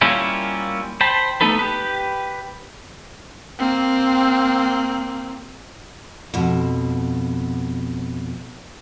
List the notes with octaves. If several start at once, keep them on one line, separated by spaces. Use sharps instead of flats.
G3 A#3 C#4 E4 F4
C5 G5 A5 B5
A3 B3 D#4 A4 B4
G4 B4
A#3 C4
F2 B2